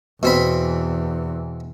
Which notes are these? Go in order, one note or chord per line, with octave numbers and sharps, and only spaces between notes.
E2 B2 C4 B5